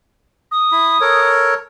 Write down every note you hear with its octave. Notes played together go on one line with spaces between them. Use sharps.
D#6
E4 B5
A4 A#4 C#5